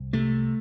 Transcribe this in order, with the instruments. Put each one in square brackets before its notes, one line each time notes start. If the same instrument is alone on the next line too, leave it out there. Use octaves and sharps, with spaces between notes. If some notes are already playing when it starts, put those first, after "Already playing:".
Already playing: [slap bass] C2
C3 A3